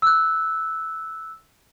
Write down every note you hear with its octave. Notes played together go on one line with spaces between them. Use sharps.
E6 F#6